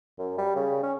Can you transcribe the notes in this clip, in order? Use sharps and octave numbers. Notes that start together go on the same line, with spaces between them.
F#2
G3
C#3
C#4